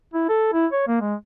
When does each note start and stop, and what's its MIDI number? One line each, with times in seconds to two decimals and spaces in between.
0.14 0.25 64
0.29 0.50 69
0.53 0.66 64
0.72 0.86 73
0.88 0.98 58
1.01 1.15 56